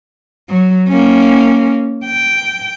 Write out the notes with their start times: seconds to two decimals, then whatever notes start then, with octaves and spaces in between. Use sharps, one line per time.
0.49 F#3
0.89 A#3 C#4
2.05 G5